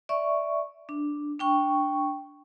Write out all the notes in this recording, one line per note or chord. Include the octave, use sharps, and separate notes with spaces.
D5 E5 C#6
D4
D4 G5 C#6